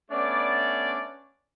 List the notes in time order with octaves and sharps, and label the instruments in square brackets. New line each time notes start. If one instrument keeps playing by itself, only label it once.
[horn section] A3 B3 C#4 D4 D5